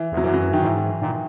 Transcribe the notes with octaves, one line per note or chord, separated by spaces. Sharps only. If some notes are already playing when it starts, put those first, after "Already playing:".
Already playing: E3
E2
F#3
F#2 E3
F#3
E3
D#3
G#2 E3
A#2 D#3